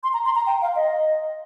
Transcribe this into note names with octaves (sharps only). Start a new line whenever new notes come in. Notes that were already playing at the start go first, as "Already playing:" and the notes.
C6
A#5
C6
A#5
G5
F5
D#5